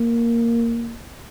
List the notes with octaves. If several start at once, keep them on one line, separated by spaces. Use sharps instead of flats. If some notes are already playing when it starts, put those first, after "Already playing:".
Already playing: A#3